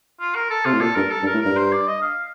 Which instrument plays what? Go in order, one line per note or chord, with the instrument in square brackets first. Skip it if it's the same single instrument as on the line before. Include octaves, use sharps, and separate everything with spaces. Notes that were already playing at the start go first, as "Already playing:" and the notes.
[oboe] F4
A#4
A4
[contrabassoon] C3 [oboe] F4
[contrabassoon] A2
[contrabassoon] A#2 [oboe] A4
[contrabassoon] G2 [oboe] A#4
[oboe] A4
[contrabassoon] G2
[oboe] A#4
[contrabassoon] A2
[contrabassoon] G2 [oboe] A#4
[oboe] C5
D5
D#5
F5